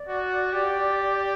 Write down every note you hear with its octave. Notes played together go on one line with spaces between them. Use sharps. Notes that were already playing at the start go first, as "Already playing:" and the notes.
Already playing: D5
F#4
G4